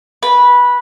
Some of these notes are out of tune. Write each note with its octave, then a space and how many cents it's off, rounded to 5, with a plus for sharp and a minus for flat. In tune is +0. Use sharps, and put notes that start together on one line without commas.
B4 -15